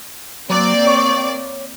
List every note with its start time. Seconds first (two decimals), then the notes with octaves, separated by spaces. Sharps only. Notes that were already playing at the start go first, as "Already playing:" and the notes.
0.50 F#3 A#3 C4 D5
0.87 C#5